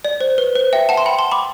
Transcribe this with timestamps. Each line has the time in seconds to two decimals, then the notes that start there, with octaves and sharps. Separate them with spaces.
0.04 D5
0.21 C5
0.38 B4
0.55 C5
0.73 E5 G5
0.89 F#5 A5
0.97 C6
1.06 G5 B5
1.18 A5 C6
1.31 B5 D6